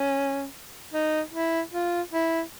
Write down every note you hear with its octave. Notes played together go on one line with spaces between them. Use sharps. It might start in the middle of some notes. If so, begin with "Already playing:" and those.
Already playing: C#4
D#4
E4
F4
E4